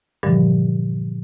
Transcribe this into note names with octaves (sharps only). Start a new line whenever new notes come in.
G2 A#2 D3 E3 F3 G3